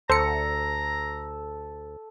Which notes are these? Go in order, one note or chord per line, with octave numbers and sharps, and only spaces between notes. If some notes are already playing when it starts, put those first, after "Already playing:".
D2 A4 C5 A#5 C#7